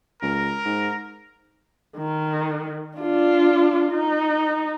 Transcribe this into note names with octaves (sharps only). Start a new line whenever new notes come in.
C#2 A#4
G#2
D#3
D4 F4
D#4